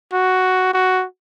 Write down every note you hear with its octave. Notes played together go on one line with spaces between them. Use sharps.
F#4
F#4